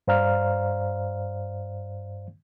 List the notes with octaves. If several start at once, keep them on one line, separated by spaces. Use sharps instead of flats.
G2 C5 D5 F5 A#5 F6